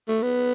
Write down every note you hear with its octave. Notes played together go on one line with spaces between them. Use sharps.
A3
B3